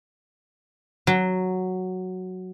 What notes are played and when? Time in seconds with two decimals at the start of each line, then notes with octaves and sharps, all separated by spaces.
1.07 F#3